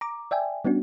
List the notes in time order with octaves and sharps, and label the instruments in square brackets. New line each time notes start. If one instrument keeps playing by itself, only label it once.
[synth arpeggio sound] A#5 D6
D5 E5 G5 G#5
G3 B3 C#4 D4 F#4